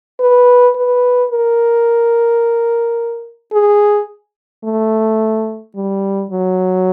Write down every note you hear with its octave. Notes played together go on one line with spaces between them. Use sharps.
B4
B4
A#4
G#4
A3
G3
F#3